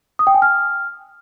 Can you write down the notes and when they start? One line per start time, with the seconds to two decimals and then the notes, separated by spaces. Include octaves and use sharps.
0.19 D#6
0.27 G5
0.34 G#5
0.42 F6